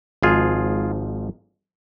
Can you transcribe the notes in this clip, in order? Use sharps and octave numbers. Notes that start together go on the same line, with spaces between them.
G#1 G#2 F3 F4 G#4